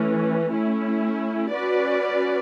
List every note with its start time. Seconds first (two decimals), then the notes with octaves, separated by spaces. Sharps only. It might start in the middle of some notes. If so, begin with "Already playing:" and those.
Already playing: E3 A3 C#4
0.51 A3 C#4 E4
1.52 C#4 F#4 B4 D5